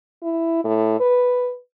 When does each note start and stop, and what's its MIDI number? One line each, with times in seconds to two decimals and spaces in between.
0.23 0.61 64
0.64 0.99 45
1.00 1.55 71